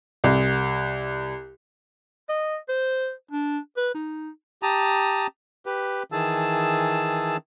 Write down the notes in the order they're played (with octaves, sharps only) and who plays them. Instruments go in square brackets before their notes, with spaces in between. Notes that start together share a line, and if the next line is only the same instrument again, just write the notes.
[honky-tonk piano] C2
[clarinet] D#5
C5
D4
B4
D#4
[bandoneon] G4 A5 A#5 D#6
G4 B4
D#3 E3 G#4 A5 E6